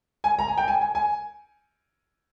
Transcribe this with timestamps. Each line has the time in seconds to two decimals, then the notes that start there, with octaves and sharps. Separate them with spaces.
0.24 G#5
0.39 A#5
0.48 G#5
0.58 G5
0.68 G#5
0.81 G#5
0.95 G#5